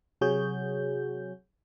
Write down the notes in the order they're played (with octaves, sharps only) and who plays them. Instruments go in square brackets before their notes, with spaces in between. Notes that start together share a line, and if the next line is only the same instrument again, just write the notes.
[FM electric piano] C3 F#3 F#4 G#4 C#5 G6